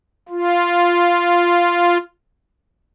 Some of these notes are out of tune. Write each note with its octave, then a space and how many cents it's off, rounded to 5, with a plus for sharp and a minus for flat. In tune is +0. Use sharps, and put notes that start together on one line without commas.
F4 -5